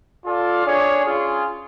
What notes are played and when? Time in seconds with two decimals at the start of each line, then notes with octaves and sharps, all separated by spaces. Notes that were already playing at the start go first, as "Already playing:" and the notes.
0.23 F4 A4 D5 F5
0.63 D4 G#4 C#5
1.04 C#4 F4 G#4